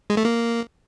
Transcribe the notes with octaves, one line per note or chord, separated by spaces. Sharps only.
G#3
A3
A#3